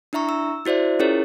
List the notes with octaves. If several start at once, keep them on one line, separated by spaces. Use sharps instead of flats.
D4 E4 E5 A#5 C#6
E6
E4 F#4 C5 D5 E5
C#4 E4 F4 G#4 A#4 C#5